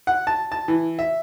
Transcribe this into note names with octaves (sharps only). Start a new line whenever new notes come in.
F#5
A5
A5
E3
E5